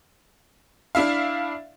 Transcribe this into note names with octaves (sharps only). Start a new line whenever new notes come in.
D4 E4 E5 F5